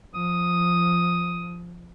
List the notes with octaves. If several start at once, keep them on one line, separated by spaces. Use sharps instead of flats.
F3 D#6